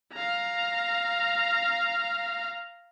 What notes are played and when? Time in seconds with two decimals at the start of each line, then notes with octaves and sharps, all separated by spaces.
0.14 F5 A#5